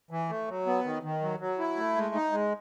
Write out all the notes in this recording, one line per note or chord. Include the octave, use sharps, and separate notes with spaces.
E3
A3
F#3
B3
D#3
D#3
F#3
F#3
E4
A3
G#3
D#4
G#3